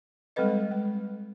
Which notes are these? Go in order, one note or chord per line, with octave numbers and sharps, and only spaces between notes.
G3 G#3 C4 A4 B4 D#5
G#3